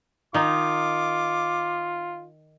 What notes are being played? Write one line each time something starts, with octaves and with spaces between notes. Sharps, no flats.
D#3 D#4 F4 D6